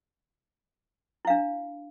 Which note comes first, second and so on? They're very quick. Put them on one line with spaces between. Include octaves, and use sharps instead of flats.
E4 F5 D4